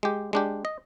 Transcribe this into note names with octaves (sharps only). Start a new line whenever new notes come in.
G#3 G4
G#3 D4 G4
D#5